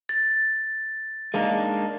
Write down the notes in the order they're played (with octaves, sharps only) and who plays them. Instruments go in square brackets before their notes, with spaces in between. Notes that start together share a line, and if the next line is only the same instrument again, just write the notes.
[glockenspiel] A6
[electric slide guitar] G#3 D4 D#4 [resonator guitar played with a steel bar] A#3